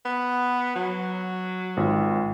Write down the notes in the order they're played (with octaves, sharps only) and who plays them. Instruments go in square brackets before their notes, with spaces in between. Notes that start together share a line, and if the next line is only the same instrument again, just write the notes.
[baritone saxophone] B3
F#3
[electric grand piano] G#1 F4